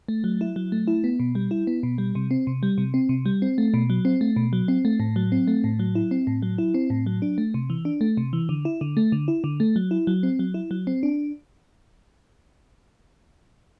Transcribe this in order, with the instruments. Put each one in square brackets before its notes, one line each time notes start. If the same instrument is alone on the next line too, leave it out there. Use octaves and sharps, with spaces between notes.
[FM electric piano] A3
F#3
E4
F#3
A3
E4
B3
B2
G3
E4
B3
B2
G3
C3
C4
C3
G3
C3
C4
C3
G3
C4
A3
B2
F#3
C4
A3
B2
F#3
C4
A3
A2
F#3
C4
A3
A2
F#3
E4
C4
A2
F#3
E4
C4
A2
F#3
D4
A3
C3
E3
D4
A3
C3
E3
D3
E4
D3
A3
D3
E4
D3
A3
F#3
E4
F#3
C4
F#3
E4
F#3
C4
D4